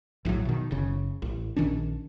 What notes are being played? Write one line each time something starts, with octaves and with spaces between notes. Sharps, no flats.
A#1 A2 D#3 F#3
B2 D#3
F#1 C#3
A1
A#1 D#3 C#4 D4